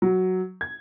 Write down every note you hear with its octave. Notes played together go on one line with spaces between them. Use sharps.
F#3
G#6